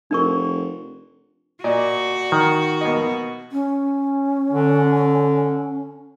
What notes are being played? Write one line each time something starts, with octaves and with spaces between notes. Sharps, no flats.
F1 D4 A#4 C#6
A#2 F#4 D5 D#5
D#3
B2 A#3 D#5
C#4
D3